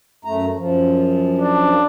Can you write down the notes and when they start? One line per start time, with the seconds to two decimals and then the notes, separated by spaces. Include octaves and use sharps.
0.25 F#2 A3 A#5
0.56 F#2 F3
1.39 D4